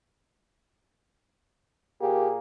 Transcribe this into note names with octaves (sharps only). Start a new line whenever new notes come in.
A#2 A#3 G4 G#4